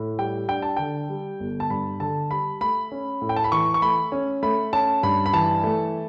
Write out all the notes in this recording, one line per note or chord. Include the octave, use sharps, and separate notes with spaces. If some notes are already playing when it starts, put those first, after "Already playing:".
Already playing: A2
G3 G5
D4 G5
A5
D3 G5
G3
G1
A5
G2 B5
D3 A5
G3 B5
A3 B5
C#4
A2
G5
A5
B5
E3 C#6
C#6
A3 B5
C#4
A3 B5
C#4 A5
G2 B5
B5
E3 A5
A3